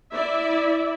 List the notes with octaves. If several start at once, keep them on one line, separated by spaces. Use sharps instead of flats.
E4 D5 E5